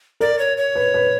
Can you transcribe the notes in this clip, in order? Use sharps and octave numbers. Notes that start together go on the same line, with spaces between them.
A#4 D5
C#5
C#5
B4
B4